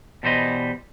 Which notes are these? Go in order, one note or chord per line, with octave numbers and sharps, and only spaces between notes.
B2 E3 G3 C5 D#5